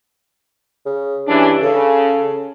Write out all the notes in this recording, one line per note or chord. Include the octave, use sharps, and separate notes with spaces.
C#3
G2 E3 C#4 D4
C#3 A4